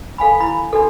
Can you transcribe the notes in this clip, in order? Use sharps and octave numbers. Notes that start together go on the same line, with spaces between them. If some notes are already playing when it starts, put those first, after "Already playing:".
A4 F5 G#5 B5
E4 B5
D4 F#4 A4